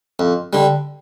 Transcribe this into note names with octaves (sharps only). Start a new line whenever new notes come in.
F2
D3 G3